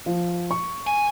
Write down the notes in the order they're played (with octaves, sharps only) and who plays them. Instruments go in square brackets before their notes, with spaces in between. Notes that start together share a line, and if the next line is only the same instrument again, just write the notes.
[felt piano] F3
C#6
[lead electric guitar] G#5